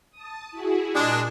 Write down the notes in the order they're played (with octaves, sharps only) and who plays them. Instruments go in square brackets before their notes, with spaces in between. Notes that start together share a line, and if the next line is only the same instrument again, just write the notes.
[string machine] A5 D#6
E4 F#4 G#4
[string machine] A#2 [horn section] G#3 D4